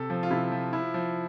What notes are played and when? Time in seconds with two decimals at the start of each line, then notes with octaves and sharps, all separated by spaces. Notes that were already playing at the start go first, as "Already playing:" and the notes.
Already playing: C3 A4
0.10 F3
0.23 F4
0.30 C3 E4
0.52 F3
0.73 F3 E4
0.94 F3